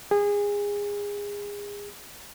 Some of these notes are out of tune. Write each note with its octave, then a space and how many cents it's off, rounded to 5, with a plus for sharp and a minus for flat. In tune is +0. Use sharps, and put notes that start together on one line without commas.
G#4 -25